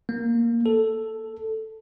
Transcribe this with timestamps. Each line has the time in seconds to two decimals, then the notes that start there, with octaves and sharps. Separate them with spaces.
0.09 A#3
0.66 A4